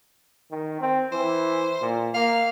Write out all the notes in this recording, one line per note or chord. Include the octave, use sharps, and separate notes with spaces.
D#3
C4
E3 C5
A#2
A#3 F5